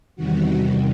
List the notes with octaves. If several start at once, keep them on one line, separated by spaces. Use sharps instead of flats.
E2 C3 D#3 G3 F#4